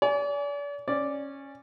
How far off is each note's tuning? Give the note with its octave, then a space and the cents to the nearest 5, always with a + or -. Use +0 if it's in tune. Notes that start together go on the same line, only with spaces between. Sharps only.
D5 -40 G#5 +10
C#4 -10 D5 +0